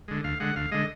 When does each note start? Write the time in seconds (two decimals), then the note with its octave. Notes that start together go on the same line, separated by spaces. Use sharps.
0.08 D3 G#3
0.24 D2 F5
0.40 D3 G#3 F#5
0.56 D2 F5
0.72 D3 G#3 D#5